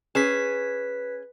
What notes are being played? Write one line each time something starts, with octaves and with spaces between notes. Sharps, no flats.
C#4 G#4 B4 B6